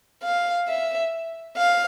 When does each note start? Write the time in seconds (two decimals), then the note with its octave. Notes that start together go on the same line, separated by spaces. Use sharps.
0.23 F5
0.68 E5
1.57 F5